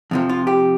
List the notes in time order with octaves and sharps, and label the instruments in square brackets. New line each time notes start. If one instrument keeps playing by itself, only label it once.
[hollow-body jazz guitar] F2 C3 F3
F4
G4